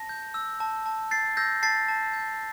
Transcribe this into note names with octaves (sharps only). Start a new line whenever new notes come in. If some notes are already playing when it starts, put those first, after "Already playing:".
Already playing: A5 A#6
G6
E6
A5
A5
G6 A6 C7
E6 G6 A#6
A5 A6 C7
A5
G6